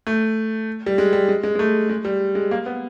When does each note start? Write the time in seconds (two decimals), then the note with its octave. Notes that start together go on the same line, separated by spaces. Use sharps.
0.07 A3
0.86 G3
0.98 G#3
1.13 G3
1.29 G#3
1.43 G#3
1.55 G#3
1.59 A3
1.89 G#3
2.05 G3
2.35 G#3
2.51 A#3
2.66 B3